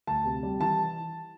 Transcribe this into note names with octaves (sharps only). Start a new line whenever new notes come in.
D2 A5
C3
G3
E3 A5